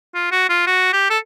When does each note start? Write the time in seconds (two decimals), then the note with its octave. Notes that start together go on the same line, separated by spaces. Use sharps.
0.15 F4
0.32 F#4
0.49 F4
0.67 F#4
0.93 G4
1.10 A4